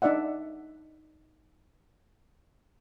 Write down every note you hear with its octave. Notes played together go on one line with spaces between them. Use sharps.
D4 D#4 D5 E5 F#5